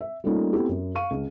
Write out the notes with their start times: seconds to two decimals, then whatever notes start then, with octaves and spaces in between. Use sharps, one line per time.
0.01 E5
0.24 G3 A3 A#3 C#4 D#4 F4
0.53 A3 B3 C4 E4 G4 A4
0.69 F#2
0.95 F5 C#6 D#7
1.11 C#2